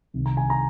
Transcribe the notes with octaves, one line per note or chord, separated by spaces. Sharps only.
C2 C3 D#3
A#5
G#5
A#5